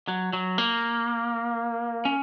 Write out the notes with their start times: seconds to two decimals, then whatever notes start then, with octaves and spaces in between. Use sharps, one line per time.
0.08 F#3
0.33 F#3
0.58 A#3
2.05 C#4